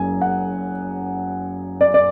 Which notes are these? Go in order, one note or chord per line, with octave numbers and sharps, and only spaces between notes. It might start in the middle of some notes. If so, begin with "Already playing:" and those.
Already playing: F#1 F#2 G#5
F#5
D5
D5